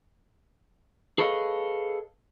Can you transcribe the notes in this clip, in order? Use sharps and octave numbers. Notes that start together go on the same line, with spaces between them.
G#4 A4 B4 C#5 D#5 F5